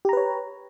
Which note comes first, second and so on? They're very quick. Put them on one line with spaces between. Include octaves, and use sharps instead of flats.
G4 A#5 B4 C#5